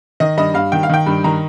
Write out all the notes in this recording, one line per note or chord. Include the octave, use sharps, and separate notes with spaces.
D#3 D#5
G2 D#5
G2 F5
D#3 G5
F5
D#3 G5
G2
D#3 A#5